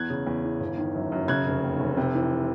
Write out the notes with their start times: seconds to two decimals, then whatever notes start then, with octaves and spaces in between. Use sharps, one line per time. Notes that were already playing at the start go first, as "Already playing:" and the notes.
Already playing: E2 F#6 G#6
0.10 C#3
0.27 E2
0.44 E3
0.60 G1
0.77 D#3
0.95 F#2
1.12 F#2
1.28 C#3 F#6 G#6
1.46 F1
1.63 D#2
1.80 F1
1.97 C3
2.15 E3